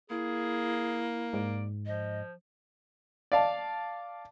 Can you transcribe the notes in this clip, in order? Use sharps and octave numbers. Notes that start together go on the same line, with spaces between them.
A#3 E4 G#4
G#2 D5
F3 D#5
D5 F5 A5